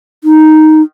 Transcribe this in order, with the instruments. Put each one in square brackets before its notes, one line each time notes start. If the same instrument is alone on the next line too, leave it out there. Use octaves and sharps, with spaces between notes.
[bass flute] D#4